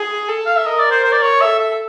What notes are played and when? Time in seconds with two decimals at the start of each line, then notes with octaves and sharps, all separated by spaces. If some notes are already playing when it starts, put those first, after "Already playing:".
Already playing: G#4
0.29 A4
0.46 F5
0.56 E5
0.66 A#4 D#5
0.79 D5
0.91 C5
1.04 C5
1.12 D5
1.22 C#5
1.41 A4 E5
1.59 E5